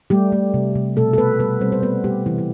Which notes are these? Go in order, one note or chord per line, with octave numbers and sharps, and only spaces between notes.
G3 A3 G4
A3
C3
C3
B2 A3 A4
A4
A3 B3 B4
G3 B3 B4
G3 C4 C5
C5
A3 B3 B4
G3 A3 G4
C3 E3 E4
E4